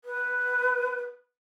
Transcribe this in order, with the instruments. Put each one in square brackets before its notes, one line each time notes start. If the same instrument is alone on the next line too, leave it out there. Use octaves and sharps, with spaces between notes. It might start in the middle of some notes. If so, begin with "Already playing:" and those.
[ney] B4